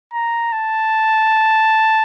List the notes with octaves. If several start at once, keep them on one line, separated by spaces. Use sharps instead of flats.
A#5
A5